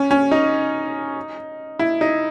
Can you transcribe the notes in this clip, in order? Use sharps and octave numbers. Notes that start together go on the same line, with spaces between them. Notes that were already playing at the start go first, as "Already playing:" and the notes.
Already playing: C#4
C#4
D#4
E4
D#4